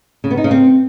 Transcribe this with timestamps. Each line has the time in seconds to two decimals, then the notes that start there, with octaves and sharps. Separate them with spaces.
0.24 C#3
0.31 B3
0.37 D#4
0.44 C#3
0.51 C4